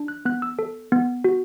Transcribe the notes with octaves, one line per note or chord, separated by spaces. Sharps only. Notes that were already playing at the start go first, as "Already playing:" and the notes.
Already playing: D4
F#6
B3 F#6
E6
A4
B3
F#4